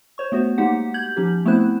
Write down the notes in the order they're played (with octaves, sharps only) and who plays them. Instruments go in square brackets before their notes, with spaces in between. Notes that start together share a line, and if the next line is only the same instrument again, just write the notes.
[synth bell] C5 C#5 C#6
A3 B3 F#4 C5
G#3 A#3 D#4 G4 F#5
G6 G#6 F#7
F3 C#4 D#4 G4
A3 B3 C4 E4 C5 F#6